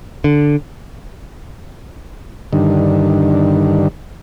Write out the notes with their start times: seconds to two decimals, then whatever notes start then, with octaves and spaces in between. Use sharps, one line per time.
0.24 D3
2.53 G2 D3 D#3